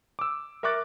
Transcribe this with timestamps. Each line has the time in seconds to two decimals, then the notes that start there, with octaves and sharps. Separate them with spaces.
0.19 D6 E6
0.63 A#4 E5 C#6 D6 F#6 A6